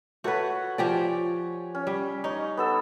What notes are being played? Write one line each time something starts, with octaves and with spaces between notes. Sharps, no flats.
A3 F#4 B4 C#5 F#5
F3 G4 D5 G#5
C#4
G3
D#4 C#5
B3 A4 E6